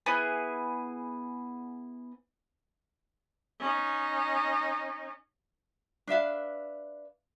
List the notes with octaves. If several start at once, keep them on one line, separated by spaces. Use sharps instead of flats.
B3 E4 G#4
C#4 D#4
D4 B4 E5 F5